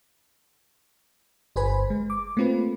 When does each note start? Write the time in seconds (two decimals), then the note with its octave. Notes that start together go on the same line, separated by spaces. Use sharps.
1.56 G1 B4 C5 G#5 B5
1.90 G#3
2.10 D6
2.37 A3 A#3 C4 F4 B4